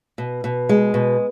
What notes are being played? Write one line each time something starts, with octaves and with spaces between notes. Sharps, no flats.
B2
B2
G#3
B2